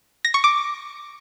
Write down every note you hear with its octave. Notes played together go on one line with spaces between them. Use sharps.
A#6
C#6
D6